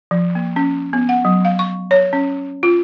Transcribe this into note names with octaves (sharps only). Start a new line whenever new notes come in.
F3
A#3
C#4
B3
F#5
F#3
F5
C#6
C#5
C#4
F4